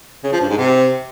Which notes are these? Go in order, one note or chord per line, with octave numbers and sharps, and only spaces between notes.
C#3
F3
G2
G#2
C3